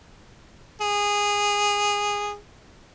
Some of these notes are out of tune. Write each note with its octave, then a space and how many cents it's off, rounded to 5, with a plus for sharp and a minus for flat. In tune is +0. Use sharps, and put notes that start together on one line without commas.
G#4 -15